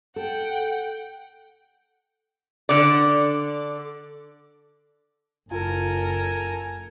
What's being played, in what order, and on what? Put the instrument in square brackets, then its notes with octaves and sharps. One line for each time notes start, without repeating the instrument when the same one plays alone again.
[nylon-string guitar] A4 [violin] F#5 G5
[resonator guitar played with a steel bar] D3 D5
[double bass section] F#1 [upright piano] F4 [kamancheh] A4 A#4 [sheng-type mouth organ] G#5